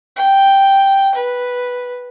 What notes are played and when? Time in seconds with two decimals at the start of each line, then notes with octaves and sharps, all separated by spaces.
0.16 G5
1.15 B4